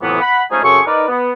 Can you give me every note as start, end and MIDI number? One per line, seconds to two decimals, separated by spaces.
0.01 0.19 41
0.01 0.19 45
0.01 0.19 48
0.01 0.19 52
0.01 0.19 54
0.01 0.19 59
0.20 0.43 78
0.20 0.43 83
0.50 0.61 53
0.50 0.61 56
0.50 0.61 57
0.50 0.61 61
0.50 0.61 63
0.50 0.61 68
0.63 0.80 42
0.63 0.80 49
0.63 0.80 60
0.63 0.80 68
0.63 0.80 69
0.63 0.80 85
0.86 1.05 63
0.86 1.05 70
0.86 1.05 71
0.86 1.05 74
1.08 1.31 59